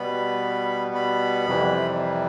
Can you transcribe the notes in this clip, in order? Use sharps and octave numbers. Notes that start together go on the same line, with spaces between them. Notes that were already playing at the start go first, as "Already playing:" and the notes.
Already playing: B2 G3 B3 B5
B5
F2 C3 E3 G3